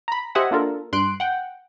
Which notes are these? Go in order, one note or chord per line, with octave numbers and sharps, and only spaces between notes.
A#5 B5
G4 C5 D#5 E5 F#5 G#5
A#3 D4 F4 A4 A#4
G2 C6 F#6 D7
F#5 G5